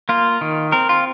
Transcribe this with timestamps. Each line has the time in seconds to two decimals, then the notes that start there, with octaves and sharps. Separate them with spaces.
0.09 A#3 F4
0.41 D#3
0.72 C4 A#4
0.89 F4